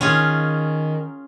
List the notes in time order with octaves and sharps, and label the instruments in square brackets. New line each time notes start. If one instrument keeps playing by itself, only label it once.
[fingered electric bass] D#3 [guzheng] C#4 F4 G#4